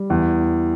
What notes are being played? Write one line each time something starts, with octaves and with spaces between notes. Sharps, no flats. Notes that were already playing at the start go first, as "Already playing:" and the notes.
Already playing: G3
E2